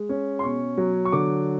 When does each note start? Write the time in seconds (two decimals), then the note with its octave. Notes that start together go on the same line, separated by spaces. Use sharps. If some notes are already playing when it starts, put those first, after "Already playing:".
Already playing: G#3
0.09 C#4
0.39 C6
0.43 B2 C#6
0.78 F#3
1.05 C#6
1.12 D3 D6